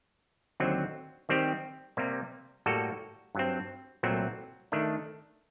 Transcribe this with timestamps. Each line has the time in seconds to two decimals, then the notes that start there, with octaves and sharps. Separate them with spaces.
0.60 D#2 D3 F#3 C4
1.29 D#3 G3 C4 G4
1.97 C3 G3 A#3
2.66 A2 G3 A#3 F#4 A4
3.35 G2 F#3 C4
4.03 C2 A#2 F#3 A3 C4
4.72 D#3 A3 D4